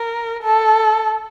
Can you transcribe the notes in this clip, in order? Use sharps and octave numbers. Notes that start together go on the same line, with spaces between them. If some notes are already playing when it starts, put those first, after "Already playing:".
Already playing: A#4
A4